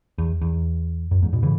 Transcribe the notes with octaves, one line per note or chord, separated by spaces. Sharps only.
E2
E2
F#2
E2 G#2
G#2 B2
C#3 E3